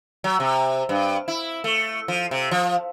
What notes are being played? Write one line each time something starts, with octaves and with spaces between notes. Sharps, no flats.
F#3
C3
G2
E4
A3
F3
C3
F3